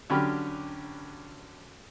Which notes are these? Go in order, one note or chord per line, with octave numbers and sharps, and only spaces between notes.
D3 F#3 C#4 G4 B5 F6